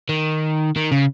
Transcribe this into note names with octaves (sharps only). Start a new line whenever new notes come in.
D#3
D#3
C#3